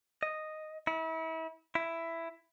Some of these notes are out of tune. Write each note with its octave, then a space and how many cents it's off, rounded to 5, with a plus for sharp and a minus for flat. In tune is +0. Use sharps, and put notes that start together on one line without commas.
D#5 -5
E4 -35
E4 +10